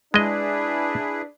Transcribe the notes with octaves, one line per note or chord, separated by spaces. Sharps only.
G#3 D4 E4 G#4 B4 D#5